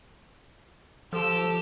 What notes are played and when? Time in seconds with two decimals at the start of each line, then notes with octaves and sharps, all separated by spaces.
1.13 F3 G4 A4 E6